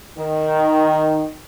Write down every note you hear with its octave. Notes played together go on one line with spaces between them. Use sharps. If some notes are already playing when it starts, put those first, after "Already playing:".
D#3